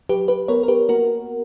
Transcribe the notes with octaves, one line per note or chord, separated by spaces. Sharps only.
F#3 G4 B4
G4 B4
B3 A#4 C#5
A#4
G4 B4
A#3 F#4 A#4